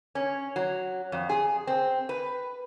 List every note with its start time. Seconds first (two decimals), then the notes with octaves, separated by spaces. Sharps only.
0.15 C#4
0.56 F#3
1.12 F2
1.29 G#4
1.67 C4
2.09 B4